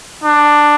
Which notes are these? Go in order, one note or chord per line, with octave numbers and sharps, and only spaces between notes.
D4